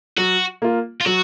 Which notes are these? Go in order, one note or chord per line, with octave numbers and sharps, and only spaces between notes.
F#3 F#4
A#3 F4
F4
F#3 F#4